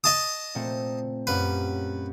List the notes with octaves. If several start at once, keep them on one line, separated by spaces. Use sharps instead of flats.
D#5 A5 D#6
A#2 A3 C4
F#2 G4 B4 F5